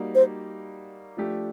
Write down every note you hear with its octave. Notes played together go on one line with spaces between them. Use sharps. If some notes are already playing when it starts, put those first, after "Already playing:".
Already playing: G3 A#3 D#4 F#4
C5
F3 A3 D4 G4